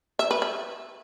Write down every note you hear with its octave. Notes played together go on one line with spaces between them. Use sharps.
E5
B4
E5